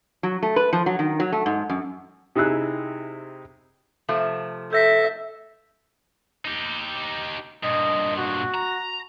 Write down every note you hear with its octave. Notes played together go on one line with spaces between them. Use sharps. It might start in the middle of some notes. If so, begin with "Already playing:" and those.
F#3
A3
B4
F3
F#3
D#3
F#3
A3
G#2
F#2
C3 D#4 E4 G#4 E6 F#6
C3 F3 A3
A4 E5 G6 A#6 B6
D#4 G4
G2 A#2 D#5
F#4
A#5